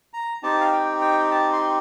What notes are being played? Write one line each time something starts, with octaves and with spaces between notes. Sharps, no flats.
A#5
C4 D#4 G4 A5
F5
G5
G5
A5
C6